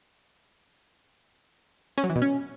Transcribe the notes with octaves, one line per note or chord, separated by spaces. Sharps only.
C#4
F#3
E3
B2
C#4